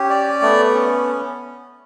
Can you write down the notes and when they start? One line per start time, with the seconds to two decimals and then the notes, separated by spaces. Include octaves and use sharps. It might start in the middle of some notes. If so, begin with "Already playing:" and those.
Already playing: C#4 G4
0.10 D5
0.42 A3 B3
0.75 C#4